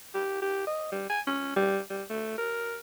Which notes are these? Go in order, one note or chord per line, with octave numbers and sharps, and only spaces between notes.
G4
G4
D#5
G3
G#5
C#4
G3
G3
A3
A#4